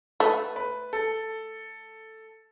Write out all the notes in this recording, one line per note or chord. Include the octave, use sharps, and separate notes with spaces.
A3 B4
B4
A4